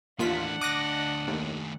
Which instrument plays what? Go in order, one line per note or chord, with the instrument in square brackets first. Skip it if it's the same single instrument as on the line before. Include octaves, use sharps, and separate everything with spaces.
[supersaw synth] D#2 F4 B6 [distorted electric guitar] E3 A3 [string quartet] D4 F#5
[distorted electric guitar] D2 D#5 [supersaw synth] D6 F#6 A#6
[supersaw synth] D#2 [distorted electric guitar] D#3 A3